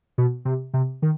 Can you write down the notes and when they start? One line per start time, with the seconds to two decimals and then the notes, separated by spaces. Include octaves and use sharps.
0.18 B2
0.45 C3
0.74 C3
1.02 D#3